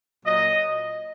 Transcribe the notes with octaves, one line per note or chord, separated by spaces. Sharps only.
A#2 F#3 A#3 D#5